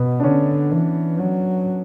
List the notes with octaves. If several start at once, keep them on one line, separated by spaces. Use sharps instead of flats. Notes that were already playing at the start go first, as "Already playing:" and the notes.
Already playing: B2 B3
D4
D3 C#4
E3
F#3